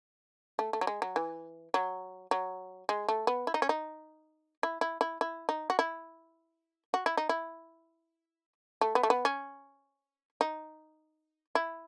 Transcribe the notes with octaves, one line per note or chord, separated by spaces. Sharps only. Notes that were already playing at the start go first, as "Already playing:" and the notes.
A3
A3
F#3
G#3
F#3
E3
F#3
F#3
G#3
A3
B3
E4
D#4
C#4
D#4
E4
E4
E4
E4
D#4
F#4
E4
F#4
E4
D#4
E4
A3
B3
A3
B3
C#4
D#4
E4